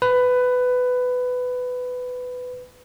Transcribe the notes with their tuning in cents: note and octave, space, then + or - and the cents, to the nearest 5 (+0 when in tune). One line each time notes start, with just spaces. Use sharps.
B4 +15